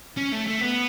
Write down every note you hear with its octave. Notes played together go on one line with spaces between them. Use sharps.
C#4
A3
A3
B3